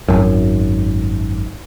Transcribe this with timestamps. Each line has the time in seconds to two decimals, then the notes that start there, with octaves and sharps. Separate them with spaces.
0.08 G#1 F#2